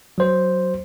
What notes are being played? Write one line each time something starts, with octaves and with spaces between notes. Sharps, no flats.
F#3 C5